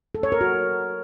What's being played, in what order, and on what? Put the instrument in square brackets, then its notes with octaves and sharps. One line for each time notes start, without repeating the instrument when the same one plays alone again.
[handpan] A4
C#5
A#4
F#4